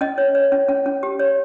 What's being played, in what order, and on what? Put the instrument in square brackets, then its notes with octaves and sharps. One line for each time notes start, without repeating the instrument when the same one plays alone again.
[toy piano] C#4 D#5
C#5
C#5
C#4
C#4
C#4
G4
C#5